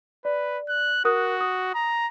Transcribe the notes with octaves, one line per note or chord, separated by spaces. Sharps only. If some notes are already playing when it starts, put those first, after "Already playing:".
B4 D5
F#6
F#4 A#4 D#6 F#6
D#6
A#5